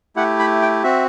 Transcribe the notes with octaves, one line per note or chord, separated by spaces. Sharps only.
A3 E4 G4 F#5
B5
G5
C4 F#4 E5